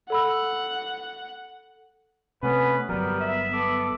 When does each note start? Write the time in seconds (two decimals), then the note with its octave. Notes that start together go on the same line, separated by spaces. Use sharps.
0.10 A4 F#5 B5 E6
2.43 C3 A3 B3 C#4 B4
2.89 G1 F#3 G3 B3 A#4
3.20 E5
3.53 B3 A4 D6